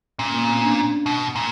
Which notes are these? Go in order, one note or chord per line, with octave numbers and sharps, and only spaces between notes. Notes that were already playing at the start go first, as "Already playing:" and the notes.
A#2 C#4
A#3
B3
C4
C#4
D4
B2
A#2